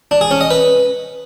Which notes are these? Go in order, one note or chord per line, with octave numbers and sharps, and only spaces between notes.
D4
G#4
C#4
D#5
B4